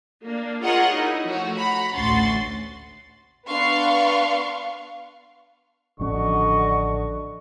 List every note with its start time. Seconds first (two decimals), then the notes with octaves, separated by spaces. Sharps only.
0.24 A#3 D4
0.62 F4 G#4 A#4 C#5 D#5 F#5
0.93 D#4 E4
1.26 F3 A3 F#4 C#5
1.55 F#5 A#5 B5
1.95 A1 D2 C#4 F#4 C6 A6
3.46 B3 D4 B4 F5 C6 C#6
6.00 A1 D3 F3 C#4 F#4 D#5 C#6